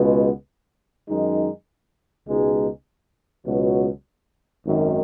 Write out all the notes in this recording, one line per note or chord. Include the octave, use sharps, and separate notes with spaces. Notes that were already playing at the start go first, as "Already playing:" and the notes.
Already playing: C#2 B2 G#3 B3
F#2 D#3 G#3 D#4
C#2 B2 G#3 D#4
C#2 B2 F#3 B3
G#1 F#2 D#3